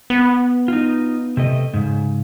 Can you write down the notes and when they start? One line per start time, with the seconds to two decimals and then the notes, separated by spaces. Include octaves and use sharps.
0.10 B3
0.68 D#4 F4
1.37 C3 A3 D#5
1.74 G#2 C#3